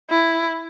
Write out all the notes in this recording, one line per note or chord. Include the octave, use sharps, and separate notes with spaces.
E4